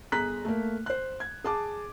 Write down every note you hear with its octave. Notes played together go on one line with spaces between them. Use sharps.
G1 G#4 A#5 F#6 B6
A3 A#3
C5 F#6
G#6
G#4 A5 D6